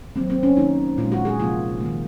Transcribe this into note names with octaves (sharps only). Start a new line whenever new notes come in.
D#3 F#3 A#3 C4
C4
C#4
D#3 A#3 D#4
A#2 F3 G#3 F4
F#4
G#4
C3 F3 A#3 F4
D#3 A#3